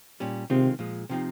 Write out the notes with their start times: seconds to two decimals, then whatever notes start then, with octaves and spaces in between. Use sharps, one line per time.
0.20 A#2 G3 C#4
0.50 C3 D#3 G#3 C4 F4
0.79 A#2 F3 G#3
1.10 C3 F3 C4 D#4